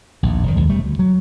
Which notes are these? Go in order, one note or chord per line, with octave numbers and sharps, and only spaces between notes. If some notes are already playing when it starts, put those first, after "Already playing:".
A#1 D#2 A2
F1 D#3
A#1 D#2 G#3
E1 G3 A3
D2
F#3